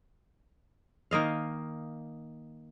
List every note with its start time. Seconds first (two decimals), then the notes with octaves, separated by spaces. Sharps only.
1.11 D#3 A#3 D#5 F5